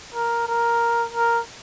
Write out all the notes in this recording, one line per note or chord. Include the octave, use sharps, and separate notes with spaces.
A#4
A#4
A#4